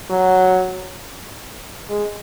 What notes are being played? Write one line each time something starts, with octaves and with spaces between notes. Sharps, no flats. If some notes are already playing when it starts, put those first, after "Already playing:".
F#3
G#3